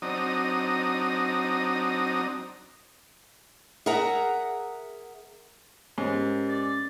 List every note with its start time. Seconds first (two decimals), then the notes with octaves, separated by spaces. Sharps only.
0.02 F#3 C4 D4 D#4 A#5 D#6
3.86 G#4 A#4 E5 F#5 A#5
5.98 G#2 C#4 G4 A#4
6.49 D5